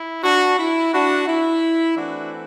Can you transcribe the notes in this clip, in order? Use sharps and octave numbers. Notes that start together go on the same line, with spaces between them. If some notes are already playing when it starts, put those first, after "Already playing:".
Already playing: E4
D4 F#4
E4
D4 F#4
E4
E3 A3 C4 D4 F#4